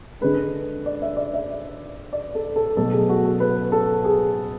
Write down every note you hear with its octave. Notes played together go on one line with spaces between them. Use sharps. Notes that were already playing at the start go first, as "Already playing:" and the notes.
D3 G#3 B4
D5
E5
D5
E5
D5
A4
A4
B2 F#3 A3 A4
G#4
F#4
A4
B4
A4
G#4